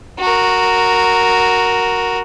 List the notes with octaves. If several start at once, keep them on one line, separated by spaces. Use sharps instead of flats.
F#4 A#4